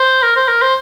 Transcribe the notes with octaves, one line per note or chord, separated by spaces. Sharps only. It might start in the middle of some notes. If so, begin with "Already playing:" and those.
Already playing: C5
A#4
C5
A#4
C5